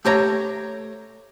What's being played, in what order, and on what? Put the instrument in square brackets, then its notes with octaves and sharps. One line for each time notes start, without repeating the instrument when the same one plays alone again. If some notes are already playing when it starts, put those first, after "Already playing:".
[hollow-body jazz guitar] A3 G4 C#5 A#5